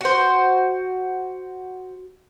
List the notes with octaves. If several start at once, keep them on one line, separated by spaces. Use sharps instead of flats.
F#4 C5